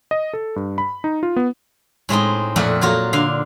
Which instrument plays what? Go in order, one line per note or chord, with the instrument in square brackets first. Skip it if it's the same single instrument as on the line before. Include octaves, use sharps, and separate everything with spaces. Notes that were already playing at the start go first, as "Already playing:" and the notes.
[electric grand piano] D#5
A4
G2
B5
D#4
F4
B3
[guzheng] A2 G#3 C4 D#4
F2 A#2 A3 A4 F#5
F#3 A#3 F4 F#4
D3 F5